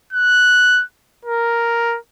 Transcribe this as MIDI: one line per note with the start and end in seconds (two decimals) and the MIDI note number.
0.13 0.83 90
1.25 1.98 70